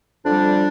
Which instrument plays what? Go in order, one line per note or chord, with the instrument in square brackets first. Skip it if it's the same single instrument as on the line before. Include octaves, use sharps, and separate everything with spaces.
[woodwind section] F2 D3 G3 D4